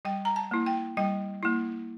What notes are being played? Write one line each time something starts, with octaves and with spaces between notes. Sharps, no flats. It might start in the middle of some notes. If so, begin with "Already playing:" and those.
G3 G5
A#5
A5
A#3 E4
G5
G3 G5
A#3 E4